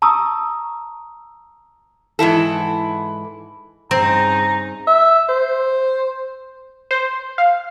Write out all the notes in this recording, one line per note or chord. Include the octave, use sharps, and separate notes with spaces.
A5 A#5 C#6 D#6 E6
G#2 E3 E4 A4
G2 C#3 C4 D#4 A#5
E5
C5
C5
F5